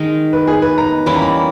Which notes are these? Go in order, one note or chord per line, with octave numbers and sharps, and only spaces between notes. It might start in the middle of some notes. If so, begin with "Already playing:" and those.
Already playing: D#3 G#3 D#4 A#4
B4
G#4
B4
A#5
E3 G3 A#3 C#4 B5
A#5
B5